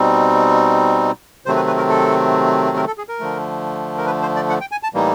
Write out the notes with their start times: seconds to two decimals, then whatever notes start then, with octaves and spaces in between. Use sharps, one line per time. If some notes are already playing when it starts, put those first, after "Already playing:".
Already playing: B2 G3 C4 D#4
1.46 C3 D#3 F#3 A3 C4 C5
1.56 B4
1.67 B4
1.78 A#4
1.89 A4
2.76 A#4
2.87 A4
2.98 G#4
3.09 A#4
3.20 D3 F3 A3
3.98 A#4
4.06 B4
4.22 C5
4.36 D5
4.50 F#5
4.61 G5
4.71 G#5
4.83 A5
4.94 A2 E3 G3 A#3 D#4